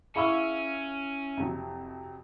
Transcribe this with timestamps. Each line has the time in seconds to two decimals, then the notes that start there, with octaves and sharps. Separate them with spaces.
0.16 C#4 E4 G#4 F5 B5 C#6 E6
1.37 F2 C3 F#3